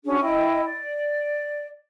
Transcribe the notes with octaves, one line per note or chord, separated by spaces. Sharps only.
C#4 D4 F#4 G#4
E4 D#5 G5
D5